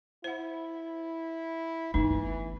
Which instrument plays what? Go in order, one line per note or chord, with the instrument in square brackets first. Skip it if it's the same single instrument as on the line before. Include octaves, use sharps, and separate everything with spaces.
[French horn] E4 [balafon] C5 F#5
[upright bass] G1 A3 [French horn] E3 [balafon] D#4